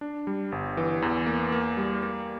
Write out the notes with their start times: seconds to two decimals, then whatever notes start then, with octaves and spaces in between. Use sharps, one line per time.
0.01 D4
0.27 G3
0.52 G1
0.77 E3
1.02 E2
1.26 A#3
1.52 A#3
1.77 G3
2.03 A#3